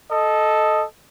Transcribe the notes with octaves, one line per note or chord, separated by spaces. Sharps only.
A4 D#5